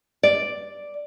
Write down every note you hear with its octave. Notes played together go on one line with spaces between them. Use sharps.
D5